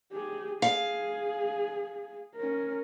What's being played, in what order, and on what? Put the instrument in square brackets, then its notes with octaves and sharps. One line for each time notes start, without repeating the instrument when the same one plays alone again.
[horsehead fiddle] G4 G#4
[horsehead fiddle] G#4 [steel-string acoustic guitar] F5
[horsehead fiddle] C#4 A#4